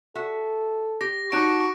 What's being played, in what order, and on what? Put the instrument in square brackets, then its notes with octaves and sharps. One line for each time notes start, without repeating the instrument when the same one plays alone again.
[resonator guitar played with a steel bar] F#4 E5 [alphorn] A4
[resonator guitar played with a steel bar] G4 [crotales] A#6
[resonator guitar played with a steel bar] D#4 C#5 A5 [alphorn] F#4 [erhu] C#6 [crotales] D6 F#6 D7